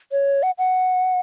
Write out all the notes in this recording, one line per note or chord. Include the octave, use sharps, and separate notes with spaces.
C#5
F#5
F#5